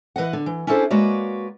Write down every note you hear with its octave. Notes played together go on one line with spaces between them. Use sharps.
E3 B4 D#5 F#5
D3
E3
C#4 D4 E4 G#4 A4 C5
G#3 A#3 F#4 B4 C#5 D5